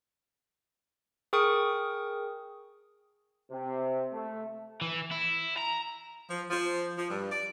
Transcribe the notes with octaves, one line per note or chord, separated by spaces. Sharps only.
G#4 A#4 G5 C#6 D#6
C3
A3
E3
E4
A#5
F3
F3
F3
G2
D5